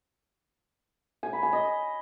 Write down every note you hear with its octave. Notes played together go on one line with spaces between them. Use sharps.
G#5
B5
G#5
D#5